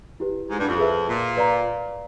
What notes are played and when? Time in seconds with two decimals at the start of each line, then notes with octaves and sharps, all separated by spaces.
0.20 E4 G4 B4
0.50 G#2
0.59 G2
0.69 F2
0.78 G#4 B4 E5
1.08 A#2
1.37 B4 D5 F5 A#5